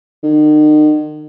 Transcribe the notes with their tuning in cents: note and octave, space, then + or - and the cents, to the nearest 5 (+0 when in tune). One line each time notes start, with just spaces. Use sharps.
D#3 -40